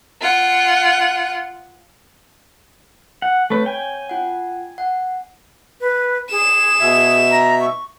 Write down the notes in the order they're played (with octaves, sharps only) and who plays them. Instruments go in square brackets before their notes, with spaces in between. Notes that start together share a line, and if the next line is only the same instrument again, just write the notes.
[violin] F4 F#5
[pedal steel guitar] F#5
[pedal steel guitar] A3 B4 [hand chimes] C4 C#5
[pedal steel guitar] G5 G#5
[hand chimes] F4 F#5
F#5
[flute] B4
[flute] G#4 [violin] E7
[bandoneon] B2 E5
[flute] A#5
C#6